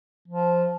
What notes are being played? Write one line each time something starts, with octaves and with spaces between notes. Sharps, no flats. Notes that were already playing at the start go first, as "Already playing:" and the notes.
F3